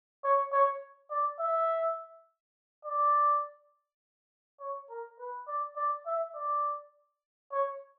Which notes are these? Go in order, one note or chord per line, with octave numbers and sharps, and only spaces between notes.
C#5
C#5
D5
E5
D5
C#5
A#4
B4
D5
D5
E5
D5
C#5